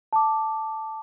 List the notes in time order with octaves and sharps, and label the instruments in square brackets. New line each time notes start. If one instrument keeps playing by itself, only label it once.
[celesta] A5 D6